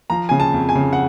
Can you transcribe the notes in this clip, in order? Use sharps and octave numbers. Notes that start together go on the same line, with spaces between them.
F3 A#5
C#3 G#5
A5
F2
G#5
C#3
F#5